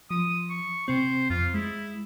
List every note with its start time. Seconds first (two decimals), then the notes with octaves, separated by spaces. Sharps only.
0.11 F3 D#6
0.50 C#6
0.88 C3 C4 C5
1.30 F2 F4
1.54 G#3 E4